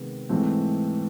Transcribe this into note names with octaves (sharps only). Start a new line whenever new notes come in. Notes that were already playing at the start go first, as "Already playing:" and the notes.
Already playing: C3 D#3 G#3 B3
G#2 E3 A3 C4